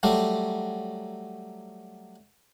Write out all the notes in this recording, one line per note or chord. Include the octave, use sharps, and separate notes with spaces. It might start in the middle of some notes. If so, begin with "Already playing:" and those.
F#3 G3 A3